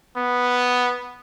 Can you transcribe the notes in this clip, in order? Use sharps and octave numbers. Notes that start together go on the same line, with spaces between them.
B3